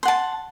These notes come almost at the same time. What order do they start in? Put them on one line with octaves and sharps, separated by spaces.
C6 F#5 A5